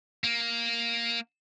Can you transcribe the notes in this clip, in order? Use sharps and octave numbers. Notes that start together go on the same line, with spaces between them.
A#3